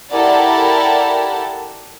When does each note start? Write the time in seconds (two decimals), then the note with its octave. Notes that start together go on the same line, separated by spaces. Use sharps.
0.10 E4 G4 A4 A#4 D5 F#5